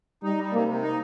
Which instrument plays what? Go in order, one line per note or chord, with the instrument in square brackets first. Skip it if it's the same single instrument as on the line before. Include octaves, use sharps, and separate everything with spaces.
[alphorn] G3 [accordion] D#4
[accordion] G3
[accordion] C3 [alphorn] A#3
[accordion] C3
D#4